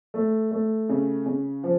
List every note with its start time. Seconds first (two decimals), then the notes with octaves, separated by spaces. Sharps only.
0.14 A3
0.51 A3
0.89 C#3
1.26 C#3
1.63 F3